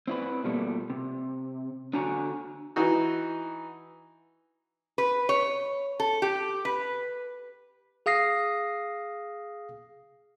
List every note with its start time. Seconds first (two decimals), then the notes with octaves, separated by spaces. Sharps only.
0.08 C4 E4 B4
0.44 B2 F3 G3 A3 A#3
0.90 C3
1.93 D3 D4 F#4 C#5 G#5 A#5
2.76 E3 D#4 F#4
4.98 B4
5.29 C#5
6.00 A4
6.22 G4
6.65 B4
8.06 G#4 F5 D#6 A#6 C7